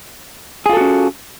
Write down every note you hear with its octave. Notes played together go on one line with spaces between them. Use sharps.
C#4 F4 F#4 G#4 A4